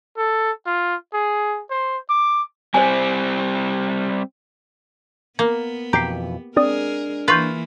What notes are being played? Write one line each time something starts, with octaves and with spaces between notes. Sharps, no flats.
A4
F4
G#4
C5
D6
G3 C4 C5 G#5
A#3 B3
F2 B2 E3 G4 A#5 C7
G#3 C4 D4 G#4 A#4 D5 D#6
E3 A#3 F4 B4 C6 C#6 G6